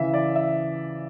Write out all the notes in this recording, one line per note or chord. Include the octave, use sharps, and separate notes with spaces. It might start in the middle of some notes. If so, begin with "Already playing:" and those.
Already playing: C#3 E3 E5
D5
E5